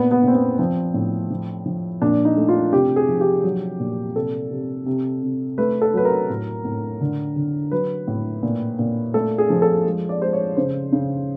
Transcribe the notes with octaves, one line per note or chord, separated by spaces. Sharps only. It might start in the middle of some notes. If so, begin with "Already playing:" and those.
Already playing: A#2 B3
B3
A#2 C4
B3
F3 C4
A2
F3
F3
A#2 D4
D#4
A3
F4
C3 G4
G#4
F3
G4
F#3
A#2
C3 A4
C3
C3
C3
A3 B4
A4
F#3 B4
A#4
A2
A2
D3
D3
F#3 B4
A2
A#2
A#2
A3 A4
G#4
F3
A4
G#3
D5
G#3 C5
C#5
C#3 C5
C#3